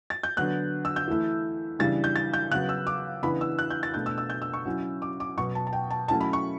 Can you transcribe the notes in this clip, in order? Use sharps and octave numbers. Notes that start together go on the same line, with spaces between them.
A6
G6
D3 F#3 B3 F#6
E6
G6
E3 A3 E4
C#3 E3 G3 D4 A6
G6
A6
G6
C#3 F#3 B3 F#6
E6
D6
C#3 E3 B3 D4 B5
E6
F#6
G6
A6
B2 A3 D4 G6
E6
E6
G6
E6
C#6
F#3 C#4 E4
D6
D6
B2 F#3 B3 C#6
A5
A5
G5
A5
F#3 A3 C#4 E4 A5
B5
C#6